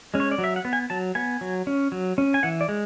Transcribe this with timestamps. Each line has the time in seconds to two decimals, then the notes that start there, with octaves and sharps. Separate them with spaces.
0.14 G#3 C#4
0.20 C#5
0.31 D5
0.38 F#3
0.44 E5
0.56 F#5
0.65 B3
0.73 G#5
0.90 F#3 A5
1.15 B3 G#5
1.41 F#3
1.67 C#4
1.92 F#3
2.18 C#4
2.34 G#5
2.43 E3 F#5
2.61 D5
2.69 G#3